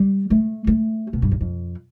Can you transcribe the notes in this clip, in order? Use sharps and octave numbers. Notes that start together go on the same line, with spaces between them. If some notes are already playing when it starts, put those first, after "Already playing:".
Already playing: G3
A3
A3
B2
G2
E2
F2